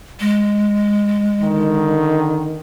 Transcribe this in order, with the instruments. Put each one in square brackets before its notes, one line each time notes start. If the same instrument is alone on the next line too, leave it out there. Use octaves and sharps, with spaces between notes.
[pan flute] G#3
[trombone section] D3 D#3